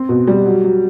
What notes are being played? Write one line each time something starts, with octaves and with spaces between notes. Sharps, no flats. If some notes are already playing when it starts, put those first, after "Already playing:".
Already playing: C4
B2
G3
F#3
F#3